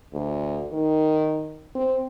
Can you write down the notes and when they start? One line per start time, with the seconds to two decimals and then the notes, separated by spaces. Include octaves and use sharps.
0.13 D2
0.73 D#3
1.75 C4